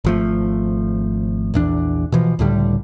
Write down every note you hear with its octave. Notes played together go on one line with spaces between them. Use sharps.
G#1 F3 A3
A#1 E2 D4
B2 E3 F3
C#2 A2 D3 G3